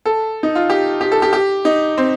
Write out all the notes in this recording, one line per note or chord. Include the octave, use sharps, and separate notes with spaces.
A4
D#4
F4
G4
G4
A4
G4
G4
D#4
C4